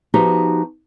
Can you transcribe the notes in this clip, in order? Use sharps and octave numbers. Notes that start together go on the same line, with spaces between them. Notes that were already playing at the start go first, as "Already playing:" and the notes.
F3 B3 D#4 F#4 G4